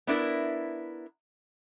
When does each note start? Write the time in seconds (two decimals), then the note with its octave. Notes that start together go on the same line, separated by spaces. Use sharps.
0.07 B3 D4 E4 A#4